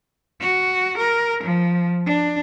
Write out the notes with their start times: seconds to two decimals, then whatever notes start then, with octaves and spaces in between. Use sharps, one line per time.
0.41 F#4
0.98 A#4
1.43 F3
2.06 D4